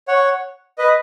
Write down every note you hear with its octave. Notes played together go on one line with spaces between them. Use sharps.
C#5 F#5
B4 D#5